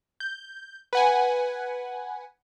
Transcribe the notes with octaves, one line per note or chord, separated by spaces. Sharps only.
G6
B4 F#5 G#5